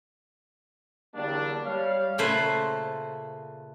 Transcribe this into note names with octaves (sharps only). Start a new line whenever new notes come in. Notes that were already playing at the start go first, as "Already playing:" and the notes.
E2 D3 F#3 G3 A#3 D4
G3 C#5 F5
A#2 C#3 A3 B4 C5